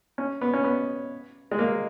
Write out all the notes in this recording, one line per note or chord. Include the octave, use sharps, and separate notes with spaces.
C#4
B3
C#4
B3
G#3
A#3